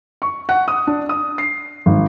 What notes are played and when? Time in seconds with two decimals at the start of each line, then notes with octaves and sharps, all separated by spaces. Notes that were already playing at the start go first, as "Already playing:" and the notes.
0.22 C#6
0.49 F#5
0.68 D#6
0.87 D4
1.09 D#6
1.38 C7
1.86 G#1